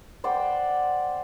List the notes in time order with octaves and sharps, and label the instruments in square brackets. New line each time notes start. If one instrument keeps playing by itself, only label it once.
[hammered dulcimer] C5 D5 F#5 G5